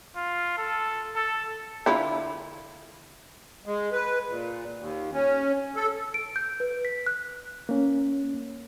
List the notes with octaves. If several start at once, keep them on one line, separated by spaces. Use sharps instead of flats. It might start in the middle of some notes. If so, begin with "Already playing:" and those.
F4
A4
A4
D3 E4 F4
G#3
B4
A#2
D#2
C#4
A4
D7
G6
B4
B6
F#6
A#3 C#4